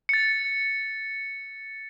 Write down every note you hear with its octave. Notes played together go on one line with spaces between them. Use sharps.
A6 C#7